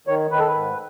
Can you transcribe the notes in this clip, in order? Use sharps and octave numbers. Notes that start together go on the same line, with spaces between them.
D#3 C#5
D#3 B4
A4
B4
G#2